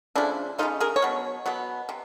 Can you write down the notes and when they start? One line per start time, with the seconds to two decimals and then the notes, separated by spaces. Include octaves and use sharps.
0.16 C#3 F3 A3 D4 E4
0.58 C#3 F3 A3 D#4 F4
0.80 G#4 A#4
0.96 C#5
1.02 B2 F#3
1.46 B2 F#3 B3
1.89 C3